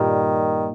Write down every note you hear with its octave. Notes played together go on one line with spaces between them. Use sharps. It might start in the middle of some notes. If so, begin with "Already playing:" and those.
Already playing: G2 A#2 D#3 G3 A#3